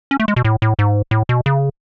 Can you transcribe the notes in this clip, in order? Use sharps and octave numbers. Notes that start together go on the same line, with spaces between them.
C#4
A3
G#3
B2
A2
A2
G#2
A2
B2
C#3